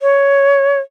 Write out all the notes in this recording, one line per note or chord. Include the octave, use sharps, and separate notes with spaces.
C#5